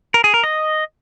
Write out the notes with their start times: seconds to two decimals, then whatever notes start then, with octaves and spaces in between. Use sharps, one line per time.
0.14 A#4
0.24 G#4
0.34 A#4
0.44 D#5